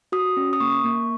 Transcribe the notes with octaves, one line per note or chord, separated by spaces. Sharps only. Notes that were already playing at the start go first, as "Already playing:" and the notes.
F#4 D#6
C#4
D#6
A#3 C#6
A#3